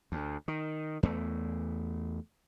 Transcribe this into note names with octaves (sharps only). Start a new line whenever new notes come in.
D2
D#3
E2 A3